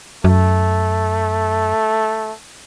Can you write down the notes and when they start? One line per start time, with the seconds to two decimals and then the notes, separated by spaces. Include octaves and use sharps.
0.24 F#2 A3